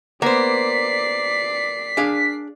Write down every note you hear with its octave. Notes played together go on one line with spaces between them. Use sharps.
A#3 B3 C5 D5 B6 C7
D4 G#4 F5